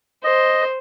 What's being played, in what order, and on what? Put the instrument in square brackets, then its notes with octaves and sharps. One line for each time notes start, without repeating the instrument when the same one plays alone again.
[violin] C5 [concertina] D#5